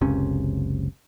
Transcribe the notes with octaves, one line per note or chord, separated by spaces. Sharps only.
F#1 C#2 C3 C#4